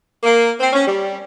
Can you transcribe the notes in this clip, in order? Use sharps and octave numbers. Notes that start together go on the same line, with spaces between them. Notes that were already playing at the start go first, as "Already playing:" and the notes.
A#3
C4
C#4
G3